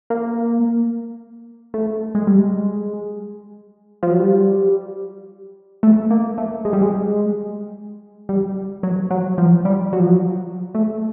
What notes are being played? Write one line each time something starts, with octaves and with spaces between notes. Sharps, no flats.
A#3
A3
G#3
G3
G#3
F3
F#3
G3
A3
A#3
A3
G#3
G3
G#3
G3
F#3
F#3
F3
G3
F#3
F3
F#3
A3